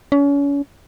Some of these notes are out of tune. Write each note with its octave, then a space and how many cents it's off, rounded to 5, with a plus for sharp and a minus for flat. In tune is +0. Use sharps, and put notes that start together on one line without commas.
C#4 +35